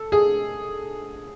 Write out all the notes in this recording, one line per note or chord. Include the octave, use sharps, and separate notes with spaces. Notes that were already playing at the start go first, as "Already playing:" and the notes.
Already playing: A4
G#4